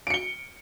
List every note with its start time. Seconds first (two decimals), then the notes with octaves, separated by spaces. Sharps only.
0.07 D7
0.10 C#7
0.14 G7